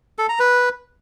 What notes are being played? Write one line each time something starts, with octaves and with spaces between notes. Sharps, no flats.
A4
A#5
B4